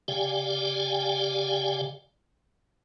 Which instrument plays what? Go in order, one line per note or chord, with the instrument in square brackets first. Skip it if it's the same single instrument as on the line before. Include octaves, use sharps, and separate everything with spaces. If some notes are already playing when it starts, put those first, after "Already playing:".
[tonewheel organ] C#3 G4 D5 F5 G5 G#5